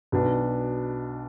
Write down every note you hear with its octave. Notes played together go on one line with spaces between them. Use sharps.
B1 B2 B3 D4